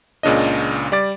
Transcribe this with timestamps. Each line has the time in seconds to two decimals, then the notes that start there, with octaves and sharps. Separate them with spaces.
0.23 C#2 A#2 C#3 D4 D#5
0.92 G3 D5 D6 A6